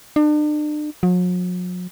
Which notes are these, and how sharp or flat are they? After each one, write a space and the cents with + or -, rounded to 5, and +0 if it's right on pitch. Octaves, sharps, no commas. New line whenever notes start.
D4 +40
F#3 -45